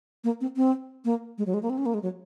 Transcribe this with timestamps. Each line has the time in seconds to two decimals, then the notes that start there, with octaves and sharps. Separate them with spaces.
0.24 A#3
0.41 C4
0.57 C4
1.05 A#3
1.38 G#3
1.46 F#3
1.54 G#3
1.62 A#3
1.70 C4
1.78 C#4
1.86 A#3
1.94 G#3
2.02 F#3